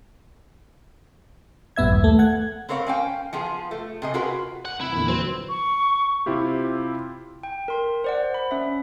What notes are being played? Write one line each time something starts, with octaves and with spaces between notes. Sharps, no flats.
A#1 G2 B3 E5 G#6
D#2
A3
F#5 G#6
B3 C4 A#4 C#5 F5
C#4 F5 G5
F3 B3 F4 G#4
A3
C3 G#4 D#5
F4 F#4 G#4 A#4 B4
F#5
C3 E4
E2 A#2 D3
F#3 C4 B4 C5
C#6
C3 C4 E4 F4 G4
G5
A#4 C6
C5 D5 F#5
B5
C#4 E5